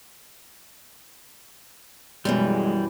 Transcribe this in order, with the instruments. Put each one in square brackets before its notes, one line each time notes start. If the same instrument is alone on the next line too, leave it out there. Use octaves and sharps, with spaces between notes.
[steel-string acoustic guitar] F#2 B2 E3 [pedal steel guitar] G3 [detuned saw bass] G#3